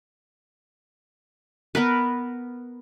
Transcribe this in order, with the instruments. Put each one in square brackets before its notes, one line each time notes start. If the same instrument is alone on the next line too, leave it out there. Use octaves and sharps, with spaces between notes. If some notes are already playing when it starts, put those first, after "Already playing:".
[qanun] B3 A#4 B4